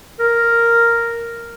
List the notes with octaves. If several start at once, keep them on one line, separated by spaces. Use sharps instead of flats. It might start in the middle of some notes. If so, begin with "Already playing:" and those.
A#4